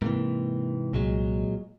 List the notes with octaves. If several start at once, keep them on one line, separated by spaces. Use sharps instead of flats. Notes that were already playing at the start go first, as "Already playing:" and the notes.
G#2 C3 E3 A#3
C2 A#2 F#3 G#3